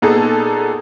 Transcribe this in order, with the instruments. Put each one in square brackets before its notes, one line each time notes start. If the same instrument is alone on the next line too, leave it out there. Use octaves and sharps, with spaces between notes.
[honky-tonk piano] A#2 B3 D#4 G#4 A4